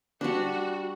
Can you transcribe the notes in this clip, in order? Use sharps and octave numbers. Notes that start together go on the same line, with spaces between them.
G3 D4 F#4